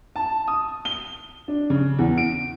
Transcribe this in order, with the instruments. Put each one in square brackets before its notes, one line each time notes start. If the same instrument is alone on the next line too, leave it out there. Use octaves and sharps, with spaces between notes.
[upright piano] A5
D#6
G7
D4
C#3
E2
D7